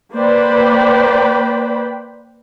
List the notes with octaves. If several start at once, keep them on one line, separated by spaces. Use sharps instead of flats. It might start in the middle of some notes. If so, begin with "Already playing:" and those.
A#3 B4 C5 D5 G5 B5